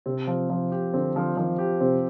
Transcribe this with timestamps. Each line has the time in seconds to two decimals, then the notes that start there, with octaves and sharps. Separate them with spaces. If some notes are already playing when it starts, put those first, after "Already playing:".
0.06 C3 C4
0.27 F3
0.50 F3
0.72 G4
0.94 D3 C4
1.15 D3 F3
1.37 D#3 F3
1.59 G4
1.80 C3 C4